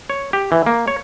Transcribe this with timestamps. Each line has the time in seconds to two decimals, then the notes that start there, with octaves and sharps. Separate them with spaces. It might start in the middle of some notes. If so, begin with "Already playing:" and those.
0.10 C#5
0.33 G4
0.52 E3
0.66 A#3
0.88 C#5